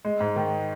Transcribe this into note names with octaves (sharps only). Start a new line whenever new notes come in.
G#3
G#2
D#3